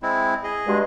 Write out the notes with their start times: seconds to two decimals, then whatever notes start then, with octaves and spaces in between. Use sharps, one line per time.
0.03 G#3 C4 E4
0.44 G#4 D#5
0.67 G2 B2 G#3